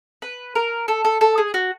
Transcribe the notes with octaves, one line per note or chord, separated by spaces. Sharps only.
B4
A#4
A4
A4
A4
G#4
F#4